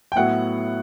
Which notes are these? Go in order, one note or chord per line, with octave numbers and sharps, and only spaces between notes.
G5
A2 F#3 B3 E4 F#5